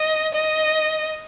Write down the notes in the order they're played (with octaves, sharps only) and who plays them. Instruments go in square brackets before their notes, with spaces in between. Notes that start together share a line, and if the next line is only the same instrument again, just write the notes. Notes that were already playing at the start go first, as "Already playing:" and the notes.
Already playing: [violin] D#5
D#5